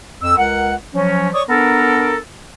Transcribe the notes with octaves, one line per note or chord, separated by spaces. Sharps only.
F2 E6
C#2 A#4 F#5
F3 F#3 C#4
C#5 D5 C#6 D#6
B3 D4 A4 A#4